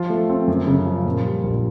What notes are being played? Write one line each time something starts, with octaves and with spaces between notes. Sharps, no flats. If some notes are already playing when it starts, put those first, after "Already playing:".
Already playing: F3 F4
A3
C4
F#2
C#3
F3
A#2
G3
A#1